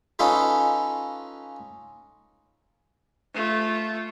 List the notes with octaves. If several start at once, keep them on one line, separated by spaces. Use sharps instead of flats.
C#4 D#4 F4 A4 B4
A3 F4